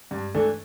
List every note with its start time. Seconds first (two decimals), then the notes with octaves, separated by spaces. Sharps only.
0.11 G2
0.34 E3 A3 D4 A4